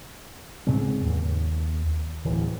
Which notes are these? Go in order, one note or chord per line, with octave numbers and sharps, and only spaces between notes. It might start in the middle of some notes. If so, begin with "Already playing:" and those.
G#2 C#3 G#3 C4
D#2
D1 E3